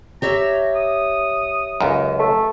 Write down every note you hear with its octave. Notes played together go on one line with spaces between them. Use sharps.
G4 C#5 E5 A#5
D#6
C#2 F#2
A3